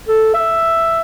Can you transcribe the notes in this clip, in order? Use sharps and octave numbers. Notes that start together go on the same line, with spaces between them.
A4
E5